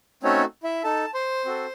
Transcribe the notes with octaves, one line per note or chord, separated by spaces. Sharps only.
A3 C4 C#4 D#4 F#4 A4 C#5
E4 E5
D#4 A4 A5
C5 C6
C4 F#4 A4